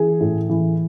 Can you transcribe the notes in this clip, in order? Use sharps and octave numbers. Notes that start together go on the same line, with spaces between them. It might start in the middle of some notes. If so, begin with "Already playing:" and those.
Already playing: E3 G#4
A2
E3